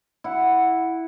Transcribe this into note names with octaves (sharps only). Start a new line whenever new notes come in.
E4 F#5